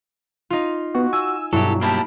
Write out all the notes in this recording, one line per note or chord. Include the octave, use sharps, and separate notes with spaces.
D#4 F4
B3 F#4
G#5 E6
G2 B2 F#3 E4 G4 A4
A#3 E4 G4 A5